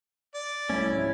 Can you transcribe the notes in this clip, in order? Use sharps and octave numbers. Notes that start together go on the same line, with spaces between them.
D5
C2 G3 A3 C#4 E4
G#2 F3